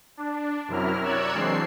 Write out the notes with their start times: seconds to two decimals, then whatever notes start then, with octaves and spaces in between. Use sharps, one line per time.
0.17 D4
0.68 F#2 C3 F#3 E4 A#4 F6
1.01 A#4 C#5 D5 E6 F#6 G#6
1.33 E3 F#3 G#3 C4 D4 C7